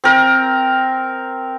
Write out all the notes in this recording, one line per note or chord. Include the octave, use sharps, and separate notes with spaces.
C4 A#4